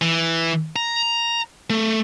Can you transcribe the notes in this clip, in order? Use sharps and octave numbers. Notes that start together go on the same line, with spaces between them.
E3
A#5
A3